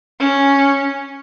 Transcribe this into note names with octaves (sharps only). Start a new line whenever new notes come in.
C#4